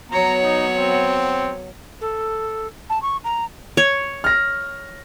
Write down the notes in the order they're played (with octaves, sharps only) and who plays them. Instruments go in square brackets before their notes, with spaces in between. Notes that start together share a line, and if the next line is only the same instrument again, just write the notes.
[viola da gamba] F#3 B3 C#5 [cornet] A#5
[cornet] D#4
C4
[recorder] A4
A5
C#6
A#5
[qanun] C#5
[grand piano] F6 A#6